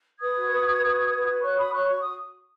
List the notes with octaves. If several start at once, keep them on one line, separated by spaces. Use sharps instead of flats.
B4 D#6 G#6
F#4
B4
F#4
B4
F#4
B4
F#4
C#5 C#6 F#6
F#4 B5 D#6
C#5 C#6 F#6
F#4 C#6
D#6